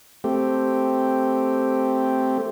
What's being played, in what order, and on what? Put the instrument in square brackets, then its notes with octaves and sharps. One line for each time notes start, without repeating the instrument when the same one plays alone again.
[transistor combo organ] A3 C4 G4